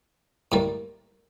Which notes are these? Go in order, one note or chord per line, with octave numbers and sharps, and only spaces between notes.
A2 G3 A#3